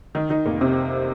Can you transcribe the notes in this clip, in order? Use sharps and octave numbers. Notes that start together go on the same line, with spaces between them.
D#3 D#4
D#3 D#4
F1 A#3
C3 C4